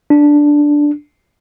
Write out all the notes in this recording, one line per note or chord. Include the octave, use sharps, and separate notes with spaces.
D4